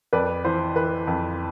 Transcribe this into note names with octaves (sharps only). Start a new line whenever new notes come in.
F2 B4 D5
E3 C5
E3 B4
F2